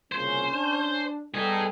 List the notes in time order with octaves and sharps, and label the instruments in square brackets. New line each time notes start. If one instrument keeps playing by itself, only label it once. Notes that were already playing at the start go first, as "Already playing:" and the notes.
[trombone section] C2 A#2 C#3 [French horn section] C#4 [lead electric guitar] C5
[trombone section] D4
[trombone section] G3 [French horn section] G#3 B3 A4 [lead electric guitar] D#4 G#4